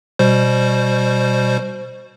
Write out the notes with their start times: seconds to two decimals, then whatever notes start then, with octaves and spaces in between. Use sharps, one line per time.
0.19 B2 G3 C5